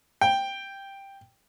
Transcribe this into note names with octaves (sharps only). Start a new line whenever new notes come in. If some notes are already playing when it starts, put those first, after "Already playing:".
G5